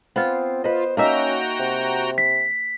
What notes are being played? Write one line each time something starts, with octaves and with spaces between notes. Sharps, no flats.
B3 C4 F4
F4 B4 C5 D#5
A#3 C#4 D#4 F#4 E5 G5 A#5
C3
B6